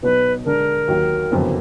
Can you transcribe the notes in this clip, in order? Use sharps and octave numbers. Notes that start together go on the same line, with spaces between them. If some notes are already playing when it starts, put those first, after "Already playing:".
B2 F#3 B3 D#4 F#4 B4
D3 G#3 D4 A#4
D#2 D#3 F#3
F#1 F2 D3 F#3 B3